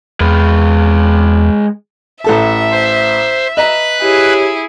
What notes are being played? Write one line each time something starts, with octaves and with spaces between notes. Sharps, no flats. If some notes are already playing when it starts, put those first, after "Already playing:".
E2 G#3 B4
A1 A4 E5 A5
C5
B4 D#5 A#5 F#6
E4 G4 G#4 C#5